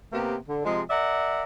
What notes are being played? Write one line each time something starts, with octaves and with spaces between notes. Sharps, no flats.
C3 A#3 B3 G4
D3
C3 F3 G#3
A#4 D5 E5 F#5